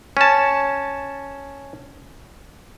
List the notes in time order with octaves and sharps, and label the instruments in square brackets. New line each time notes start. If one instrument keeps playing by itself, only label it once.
[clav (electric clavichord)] C#4 A5